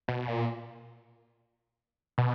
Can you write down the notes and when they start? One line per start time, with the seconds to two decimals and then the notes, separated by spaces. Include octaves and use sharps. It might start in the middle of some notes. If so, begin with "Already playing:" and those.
0.08 B2
0.28 A#2
2.18 B2